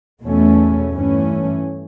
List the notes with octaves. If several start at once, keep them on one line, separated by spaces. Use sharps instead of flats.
E2 B2 A3 C#4
G2 E3 A3 C#4